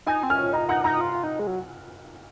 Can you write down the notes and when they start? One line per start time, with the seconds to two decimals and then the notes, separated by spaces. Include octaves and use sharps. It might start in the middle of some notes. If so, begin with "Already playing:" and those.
0.06 D#4 G#5
0.23 C4
0.30 C#4 F6
0.53 D#4 A#5
0.68 D#4 F#5
0.84 D#4 A#5
1.01 F4
1.23 D#4
1.39 G#3
1.47 F#3